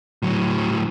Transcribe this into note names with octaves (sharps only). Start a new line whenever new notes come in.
A2 F#3